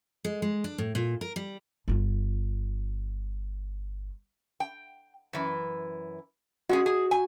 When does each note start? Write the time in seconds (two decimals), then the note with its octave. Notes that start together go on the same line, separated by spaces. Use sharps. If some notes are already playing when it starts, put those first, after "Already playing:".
0.25 G#3
0.42 G#3
0.64 D4
0.78 A2
0.95 A#2
1.21 A#4
1.36 G3
1.88 G1 F4
4.60 G5
5.33 F#2 E3
6.69 G#3 C#4 F#4 G#4
6.86 G#4
7.11 G#5